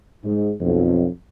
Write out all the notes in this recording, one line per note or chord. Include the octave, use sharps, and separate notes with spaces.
G#2
B1 F2